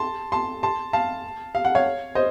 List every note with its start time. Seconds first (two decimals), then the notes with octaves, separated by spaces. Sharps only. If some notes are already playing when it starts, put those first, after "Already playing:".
Already playing: A5 C6
0.32 A5 C6
0.63 A5 C6
0.93 F5 A5
1.55 F5
1.65 F#5
1.75 C#5 F5
2.15 C5 D#5